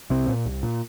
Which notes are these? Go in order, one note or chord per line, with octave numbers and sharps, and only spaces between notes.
C2 C3 C4
A#2
C2
A#2